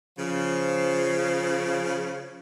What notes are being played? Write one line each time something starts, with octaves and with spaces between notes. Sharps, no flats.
C#3 F3